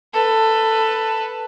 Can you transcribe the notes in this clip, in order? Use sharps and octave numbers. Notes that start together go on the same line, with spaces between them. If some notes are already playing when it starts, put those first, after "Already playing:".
A4 B4